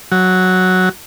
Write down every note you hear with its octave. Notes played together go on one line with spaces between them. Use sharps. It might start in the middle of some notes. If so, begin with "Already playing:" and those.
F#3